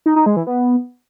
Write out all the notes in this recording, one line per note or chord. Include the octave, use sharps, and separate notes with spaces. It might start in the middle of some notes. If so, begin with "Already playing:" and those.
D#4
D#4
G#3
E3
B3